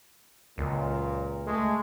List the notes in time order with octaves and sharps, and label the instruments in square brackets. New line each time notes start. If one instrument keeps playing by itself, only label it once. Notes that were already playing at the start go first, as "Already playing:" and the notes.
[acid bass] C#2 [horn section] F#2 A#2
[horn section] G#3 A3